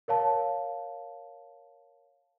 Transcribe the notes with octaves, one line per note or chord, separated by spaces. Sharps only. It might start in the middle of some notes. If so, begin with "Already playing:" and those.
A#4 C#5 F5 A5